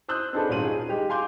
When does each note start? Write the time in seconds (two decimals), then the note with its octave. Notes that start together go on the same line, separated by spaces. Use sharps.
0.08 C5 D#6 E6 F#6 G6
0.33 C4 D4 D#4 G#4 A4 B4
0.49 D#1 G#2 C#4 F4 D#7 F#7
0.64 G#4
0.89 G#3 D#4 G4
1.09 F5 G#5 C6 D6 G6